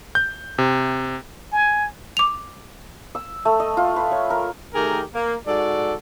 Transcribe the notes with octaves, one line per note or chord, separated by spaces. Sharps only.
G6
C3
G#5
D6 F7
E6
A3
D#5
F4
B4
C#5
A#4
D#3 A3 G4 G#4 A#4
A#3
G#2 F#4 A4 D5